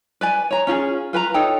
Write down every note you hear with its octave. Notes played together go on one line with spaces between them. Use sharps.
B4 D5 G#5
C#5 A#5
C#4 F4 G4 G#4
F4 B4 G5 A#5
D#4 A4 C#5 G5